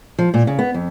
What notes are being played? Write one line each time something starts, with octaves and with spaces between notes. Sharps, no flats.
F3
A#2
C#3
B3
F2